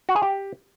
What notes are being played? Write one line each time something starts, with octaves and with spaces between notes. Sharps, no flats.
F#4
G#4
G4